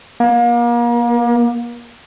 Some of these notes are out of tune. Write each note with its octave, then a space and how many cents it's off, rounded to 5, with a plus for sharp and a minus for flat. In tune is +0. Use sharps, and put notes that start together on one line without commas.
A#3 +35